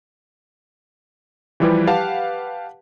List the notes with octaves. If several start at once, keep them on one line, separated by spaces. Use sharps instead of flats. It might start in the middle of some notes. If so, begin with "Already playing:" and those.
E3 F3 G3 E4 G4 B4
G4 B4 F5 F#5 A5